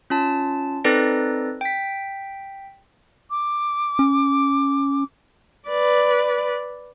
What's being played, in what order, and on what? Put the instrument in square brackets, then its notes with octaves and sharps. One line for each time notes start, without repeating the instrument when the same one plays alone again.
[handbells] C#4 F4 A5
C4 D#4 A4 B4 D5 A#6
G5 B6
[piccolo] D6
[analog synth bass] C#4
[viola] B4 D5